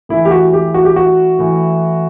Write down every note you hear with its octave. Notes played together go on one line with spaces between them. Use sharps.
A2 E3 E4
G4
F#4
G4
F#4
G4
F#4
A2 E3